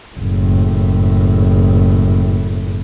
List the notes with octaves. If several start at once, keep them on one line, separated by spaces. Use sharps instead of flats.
F#1 A2